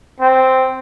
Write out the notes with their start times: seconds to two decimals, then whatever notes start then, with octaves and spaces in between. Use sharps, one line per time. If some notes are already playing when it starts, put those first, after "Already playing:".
0.20 C4